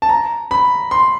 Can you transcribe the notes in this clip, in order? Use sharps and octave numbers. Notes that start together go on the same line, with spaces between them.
A5
A#5
B5
C6